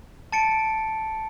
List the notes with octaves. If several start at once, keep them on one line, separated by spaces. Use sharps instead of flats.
A5 A6 C#7 D7